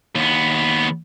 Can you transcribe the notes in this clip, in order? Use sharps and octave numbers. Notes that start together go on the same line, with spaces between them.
D#2 B3